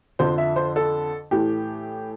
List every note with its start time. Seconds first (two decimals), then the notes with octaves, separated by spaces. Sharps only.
0.19 F2 D3 F3 C5
0.38 E5
0.56 C5
0.76 A4
1.31 A2 E3 A3 G4